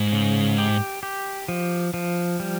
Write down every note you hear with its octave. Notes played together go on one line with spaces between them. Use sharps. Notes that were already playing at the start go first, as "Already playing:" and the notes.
Already playing: G#2
C#3
G4
G4
F3
F3
G3